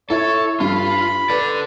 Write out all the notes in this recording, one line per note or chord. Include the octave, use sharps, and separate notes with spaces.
E4 A4 C#5
G2 F4 B5
A4 B4 D5